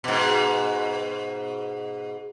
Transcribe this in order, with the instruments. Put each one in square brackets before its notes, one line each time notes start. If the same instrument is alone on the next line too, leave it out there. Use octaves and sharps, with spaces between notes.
[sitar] G#2 B2